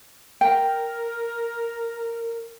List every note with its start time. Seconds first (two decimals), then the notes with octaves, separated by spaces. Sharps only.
0.41 A#4 G5